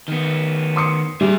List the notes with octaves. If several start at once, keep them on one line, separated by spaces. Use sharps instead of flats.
D#3 B3
C6 D#6 C#7
G3 G#4 E5